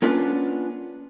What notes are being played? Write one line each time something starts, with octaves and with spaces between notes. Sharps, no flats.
A#3 B3 C#4 D4 F4 B4